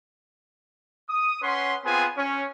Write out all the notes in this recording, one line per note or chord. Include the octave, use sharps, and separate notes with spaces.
D#6
C#4 B4 F#5 C6
B3 C4 F4 G#4 G#5
C#4